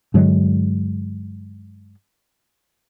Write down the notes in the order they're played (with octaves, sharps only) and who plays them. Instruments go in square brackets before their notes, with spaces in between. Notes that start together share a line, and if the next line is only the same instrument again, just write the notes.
[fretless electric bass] G2 D3 F#3 G#3